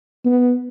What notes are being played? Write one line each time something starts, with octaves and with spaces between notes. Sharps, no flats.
B3